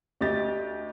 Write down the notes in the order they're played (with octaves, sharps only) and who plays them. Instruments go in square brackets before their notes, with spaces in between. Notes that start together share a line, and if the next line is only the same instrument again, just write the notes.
[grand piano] D2 G4 D#5 A6